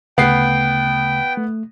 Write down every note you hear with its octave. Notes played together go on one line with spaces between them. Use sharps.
D2 C#3 A3 B3 G5 C7
A3